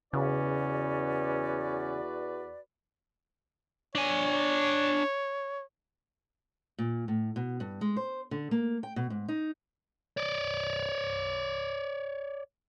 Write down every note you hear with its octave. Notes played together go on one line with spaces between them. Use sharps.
E2 C#3 C#4 F#4 B4 D5
D4 C#5 G#5
A#2
A2
B2
G2
G#3
C5
D3
A#3
G5
B2
G#2
D#4
C#5 D5